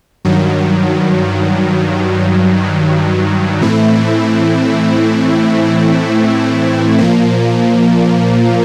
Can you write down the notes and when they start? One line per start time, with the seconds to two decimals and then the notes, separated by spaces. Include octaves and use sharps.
0.25 G2 D#3 F#3
3.61 A2 E3 A3 C4 E4
6.99 A#2 F3 A#3